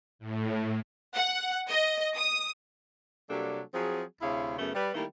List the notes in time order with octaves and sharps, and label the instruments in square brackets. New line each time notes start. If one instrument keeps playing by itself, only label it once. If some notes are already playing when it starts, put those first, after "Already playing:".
[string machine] A2
[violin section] F#5
D#5
D#6
[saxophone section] C3 F#3 G3 A#3 D4 A4
F3 F#3 C4 G#4
D2 C3 E4 G#4 C#5 F5
F#2 C#3 A3 B3
G3 B4
D#3 G3 A3 A#3 E4 A#4